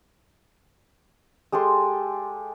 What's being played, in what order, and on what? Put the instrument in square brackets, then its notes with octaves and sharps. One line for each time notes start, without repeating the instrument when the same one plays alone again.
[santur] G#3 G4 A4 C6